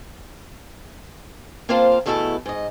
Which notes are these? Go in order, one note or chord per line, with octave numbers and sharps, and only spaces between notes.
A#3 C4 F4 C5 F5 A5
E2 B2 A3 E4 G4 A4
G#2 D#5